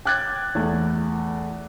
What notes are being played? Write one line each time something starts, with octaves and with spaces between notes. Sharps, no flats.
G5 D6 F#6 G#6 A6
E2 A3